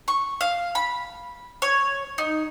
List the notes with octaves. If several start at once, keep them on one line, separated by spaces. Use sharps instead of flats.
C#6
F5
B5
C#5
D#4